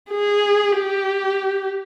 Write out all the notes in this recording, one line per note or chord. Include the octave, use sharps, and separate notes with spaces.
G#4
G4